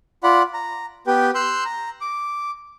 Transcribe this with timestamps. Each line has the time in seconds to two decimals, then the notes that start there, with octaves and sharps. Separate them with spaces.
0.24 F4 D5 F#5 B5
0.54 A#5
1.07 B3 G4 B4 G5
1.35 C6 E6 F#6 G6
1.65 A#5
2.01 D6